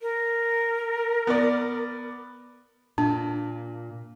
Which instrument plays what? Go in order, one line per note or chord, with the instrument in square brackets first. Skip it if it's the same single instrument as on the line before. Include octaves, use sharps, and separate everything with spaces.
[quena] A#4
[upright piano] B3 D5
[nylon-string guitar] A#2 [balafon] D4